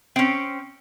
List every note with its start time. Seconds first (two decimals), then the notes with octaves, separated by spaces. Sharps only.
0.16 C4 C#4